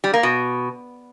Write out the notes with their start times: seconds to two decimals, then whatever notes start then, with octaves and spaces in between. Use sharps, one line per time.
0.04 G3
0.14 A#3
0.23 B2